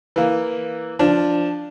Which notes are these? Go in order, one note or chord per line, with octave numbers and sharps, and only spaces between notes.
E3 A#3
F3 D4